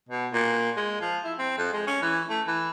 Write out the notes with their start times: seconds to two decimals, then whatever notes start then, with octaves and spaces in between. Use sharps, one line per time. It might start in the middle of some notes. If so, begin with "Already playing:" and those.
0.09 B2
0.32 A#2
0.77 G#3
1.01 F3
1.24 E4
1.38 C4
1.58 F2
1.73 G#3
1.87 C#4
2.02 E3
2.30 A3
2.48 E3